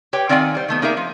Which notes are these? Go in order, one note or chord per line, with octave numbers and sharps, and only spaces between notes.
G4 B4 C#5 G5
D#3 C4 D5 F5 F#5 G#5
G3 C5
D#3 A3 B3
A#3 D#4 G#4 A#4 E5
F3